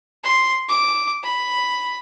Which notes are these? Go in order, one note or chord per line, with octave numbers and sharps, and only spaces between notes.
C6
D6
B5